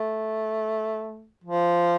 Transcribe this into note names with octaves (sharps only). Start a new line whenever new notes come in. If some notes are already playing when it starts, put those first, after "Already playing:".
Already playing: A3
F3